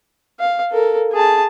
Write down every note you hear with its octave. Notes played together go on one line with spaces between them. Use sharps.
F5
A4 A#4
G#4 A5